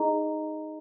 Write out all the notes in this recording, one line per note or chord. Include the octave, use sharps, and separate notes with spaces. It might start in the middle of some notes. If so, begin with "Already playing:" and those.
Already playing: D#4 G#4 D#5 A#5